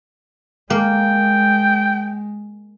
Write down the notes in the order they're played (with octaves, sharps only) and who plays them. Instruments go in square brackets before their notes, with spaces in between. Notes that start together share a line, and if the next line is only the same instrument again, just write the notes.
[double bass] G#3 [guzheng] A#3 [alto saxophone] G5